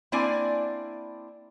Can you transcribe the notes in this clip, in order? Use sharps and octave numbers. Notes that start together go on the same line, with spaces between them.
A#3 C4 D4 E4 D5 G#5